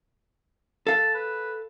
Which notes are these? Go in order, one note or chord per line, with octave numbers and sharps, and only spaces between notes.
A4 F5 A5
B4